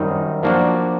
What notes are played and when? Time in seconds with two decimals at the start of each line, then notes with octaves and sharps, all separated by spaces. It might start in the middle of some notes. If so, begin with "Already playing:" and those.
Already playing: F#2 D#3 G3 C4 D#4
0.43 F3 A#3 D4 F#4